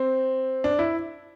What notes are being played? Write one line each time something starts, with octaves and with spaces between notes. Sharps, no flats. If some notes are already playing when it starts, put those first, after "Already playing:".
Already playing: C4
D4
E4